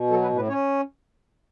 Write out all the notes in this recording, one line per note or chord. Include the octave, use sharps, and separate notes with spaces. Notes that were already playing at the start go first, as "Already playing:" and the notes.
Already playing: B2
F#3 A4
B4
A2
B4
C#4 C#5